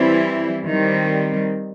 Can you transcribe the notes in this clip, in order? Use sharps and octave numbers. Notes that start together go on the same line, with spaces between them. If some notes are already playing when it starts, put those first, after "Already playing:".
Already playing: E3 G3 C4 E4
D#3 G3 C4